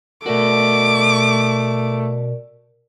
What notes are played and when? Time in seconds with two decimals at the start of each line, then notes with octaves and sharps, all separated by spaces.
0.26 B2 A3 F#4 A#4 D5 D6